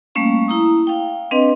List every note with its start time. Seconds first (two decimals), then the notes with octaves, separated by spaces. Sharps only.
0.15 G3 A3 A#3 C#4 F5
0.48 E4 A#5 D#6
0.87 F5 G5
1.31 C4 D4 B4 D#5 C6